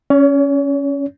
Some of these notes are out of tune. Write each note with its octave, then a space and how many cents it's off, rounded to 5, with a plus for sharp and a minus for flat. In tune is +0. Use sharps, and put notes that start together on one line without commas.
C#4 +5 C#5 +40